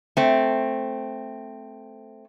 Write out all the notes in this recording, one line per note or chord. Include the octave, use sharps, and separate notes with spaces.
A3 C4